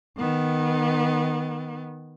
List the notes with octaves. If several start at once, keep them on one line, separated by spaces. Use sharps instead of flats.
D#3 B3